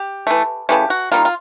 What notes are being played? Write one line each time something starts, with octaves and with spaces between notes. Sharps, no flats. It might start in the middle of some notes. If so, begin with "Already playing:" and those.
Already playing: G4
E3 A3
C#3 E3 A3 G4
F#4
D#3 G3 A#3 F4
F4